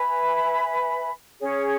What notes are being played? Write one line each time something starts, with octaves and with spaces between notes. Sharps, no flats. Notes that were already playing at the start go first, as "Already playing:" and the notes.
Already playing: B4 E5 G#5 B5
C#4 G#4 C#5